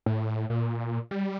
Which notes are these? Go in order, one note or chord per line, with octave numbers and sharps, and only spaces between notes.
A2
A#2
G3